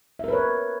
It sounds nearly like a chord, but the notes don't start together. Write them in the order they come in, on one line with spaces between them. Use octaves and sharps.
E5 A#4 B4 C#5